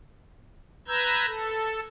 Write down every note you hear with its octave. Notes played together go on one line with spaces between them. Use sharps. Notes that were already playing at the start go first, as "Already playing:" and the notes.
B4 A#5 E6 G6 G#6
A4